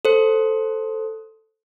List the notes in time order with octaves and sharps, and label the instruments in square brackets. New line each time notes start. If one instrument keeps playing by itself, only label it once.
[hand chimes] A4 C5